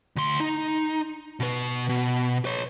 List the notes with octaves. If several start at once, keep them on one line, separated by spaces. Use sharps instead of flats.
D2 C6
D#4
B2 B4
B2
B4 C#5